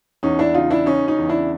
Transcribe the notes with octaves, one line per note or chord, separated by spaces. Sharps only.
E2 C#4 D#4
D4 E4
C#3 D#4 F4
D4 E4
C#3 C#4 D#4
C#4 D#4
E2
D4 E4